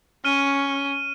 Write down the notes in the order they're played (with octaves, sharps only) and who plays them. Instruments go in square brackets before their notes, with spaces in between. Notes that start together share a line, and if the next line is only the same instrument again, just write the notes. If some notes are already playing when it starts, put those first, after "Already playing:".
[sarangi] C#4 [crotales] F6 D#7